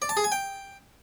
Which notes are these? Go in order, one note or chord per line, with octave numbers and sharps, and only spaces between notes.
D5
A5
G#4
G#5
G5